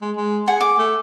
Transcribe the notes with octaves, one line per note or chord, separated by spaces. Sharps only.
G#3
G#3
G#4 F#5
D6
A3